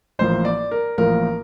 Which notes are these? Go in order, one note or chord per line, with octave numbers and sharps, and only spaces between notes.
A1 A2 F3 A#3 C5
D5
A#4
A1 A2 F3 A#3 A#4